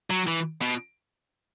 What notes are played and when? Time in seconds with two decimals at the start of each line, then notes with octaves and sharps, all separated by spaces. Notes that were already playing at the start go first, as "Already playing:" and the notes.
0.10 F#3
0.27 E3
0.61 B2